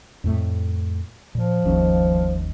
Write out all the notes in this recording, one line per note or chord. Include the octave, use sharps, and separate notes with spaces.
F2 A2 A3
A#2 F3
G1 D#2 C#4